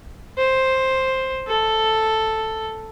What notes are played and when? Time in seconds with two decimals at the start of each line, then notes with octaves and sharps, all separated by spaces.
0.38 C5
1.48 A4